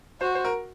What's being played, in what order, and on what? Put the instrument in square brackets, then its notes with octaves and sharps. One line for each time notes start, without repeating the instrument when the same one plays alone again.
[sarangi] F#4 [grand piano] C5
[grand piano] C5
A#4